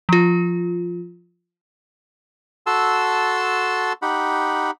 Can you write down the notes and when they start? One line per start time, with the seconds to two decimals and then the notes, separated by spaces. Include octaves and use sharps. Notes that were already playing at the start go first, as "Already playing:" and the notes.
0.09 F3 F4
2.67 F#4 A4 A5 C6 E6
4.02 D#4 G4 F#5 B5